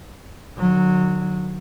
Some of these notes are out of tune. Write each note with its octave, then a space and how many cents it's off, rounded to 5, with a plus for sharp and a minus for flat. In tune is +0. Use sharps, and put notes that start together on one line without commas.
D3 +35 F#3 -15